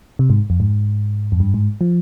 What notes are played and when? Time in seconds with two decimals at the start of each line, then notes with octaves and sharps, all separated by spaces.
0.19 C3
0.30 G#2
0.50 F2
0.60 G#2
1.32 F2
1.40 G2
1.54 G#2
1.81 F3